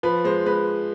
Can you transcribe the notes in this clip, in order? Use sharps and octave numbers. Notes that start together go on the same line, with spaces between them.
F3 B4
G#3 C5
G#3 B4